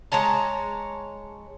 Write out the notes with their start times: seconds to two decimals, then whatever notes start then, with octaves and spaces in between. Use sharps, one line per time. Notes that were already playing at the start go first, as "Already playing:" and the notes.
0.12 G#3 C#5 A5 A#5